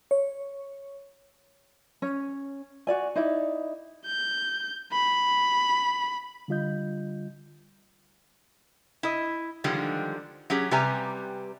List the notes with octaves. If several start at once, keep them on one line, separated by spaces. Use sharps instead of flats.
C#5
C#4
F#4 D5 G#5
D#4 E4 D5
G6
B5
D3 G3 F4 D#5 G6
E4 D#5
D3 D#3 F3 G3 G#3
F#3 C#4 G4 G#4
C3 G3 G4 B4 G#5 A#5